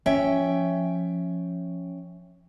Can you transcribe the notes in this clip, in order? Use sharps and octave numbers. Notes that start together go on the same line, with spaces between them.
F3 C#4 E5 G5